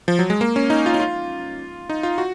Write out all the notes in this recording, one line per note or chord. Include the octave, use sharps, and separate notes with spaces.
F3
F#3
G#3
A#3
C#4
D#4
F4
D#4
F4
D#4
F4
F#4